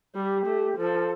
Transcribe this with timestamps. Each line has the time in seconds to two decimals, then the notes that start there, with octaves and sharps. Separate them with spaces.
0.15 G3 G4
0.46 A3
0.77 F3 A4